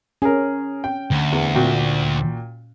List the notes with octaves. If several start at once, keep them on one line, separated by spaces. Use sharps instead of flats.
C#4 G#4 A#4
G5
D2
E2
A#2 F#4 G5